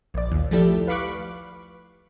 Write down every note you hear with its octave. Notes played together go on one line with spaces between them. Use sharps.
A#1 D5
D#2
F3 A3 E4 G4 A4 D5
B4 F5 B5 C#6 D6 F#6